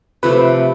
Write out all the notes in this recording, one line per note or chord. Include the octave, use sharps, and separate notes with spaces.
C3 F3 A3 B4